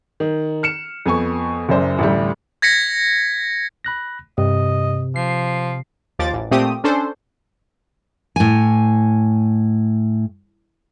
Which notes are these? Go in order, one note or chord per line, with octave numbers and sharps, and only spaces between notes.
D#3
F6 C#7 E7
F2 B3 G#5 C#6
F#1 F#2 C5 D5
A1 D2 G3
G#6 A#6 B6 C#7
B5 F#6 A#6
G2 C3 D#5
F3 C7
D#2 F3 D6 A6
A1
A#2 A3 C4 G4 D#6
C#4 D4 A4 C5
A2 G#5